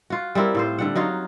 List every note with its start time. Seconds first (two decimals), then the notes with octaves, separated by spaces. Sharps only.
0.10 F4 F#4
0.35 G3 C4 E4 A#4
0.55 A2 F4 C5
0.79 D3 G3 F#5
0.95 F#3 D#4 F4 F#4